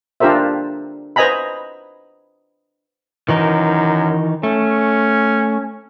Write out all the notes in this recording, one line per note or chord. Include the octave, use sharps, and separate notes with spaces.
D4 F4 G4 A#4 C5 E5
B4 C5 D#5 G#5 A#5 B5
F#2 D#3 E3 D#4
A3 C#4